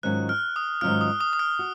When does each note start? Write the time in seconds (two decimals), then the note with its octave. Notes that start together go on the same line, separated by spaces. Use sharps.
0.03 G#2 D#3 F#3 C#4 F4 F#6
0.29 F6
0.56 D#6
0.81 G#2 D#3 F#3 C#4 F4 F6
1.01 D#6
1.20 D#6
1.33 D#6
1.39 F6
1.59 F#4